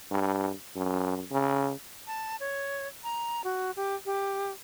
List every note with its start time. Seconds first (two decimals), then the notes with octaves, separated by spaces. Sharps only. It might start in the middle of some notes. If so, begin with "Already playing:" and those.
0.11 G2
0.76 F#2
1.31 C#3
2.07 A5
2.40 C#5
3.04 A#5
3.44 F#4
3.76 G4
4.06 G4